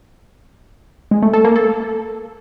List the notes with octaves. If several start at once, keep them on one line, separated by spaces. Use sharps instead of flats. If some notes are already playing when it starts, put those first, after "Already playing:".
G#3
A3
A4
A#3
A4